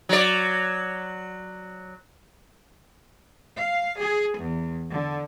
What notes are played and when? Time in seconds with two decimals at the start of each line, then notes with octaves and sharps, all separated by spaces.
0.09 F#3 D5
3.58 F5
4.00 G#4
4.40 E2
4.92 D3